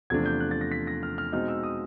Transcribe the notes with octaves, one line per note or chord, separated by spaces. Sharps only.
E2 C3 F3 A3 D4 G#6
G6
F#6
A6
A#6
B6
A#6
F6
F6
B2 G#3 C4 D#4 F6
E6
D#6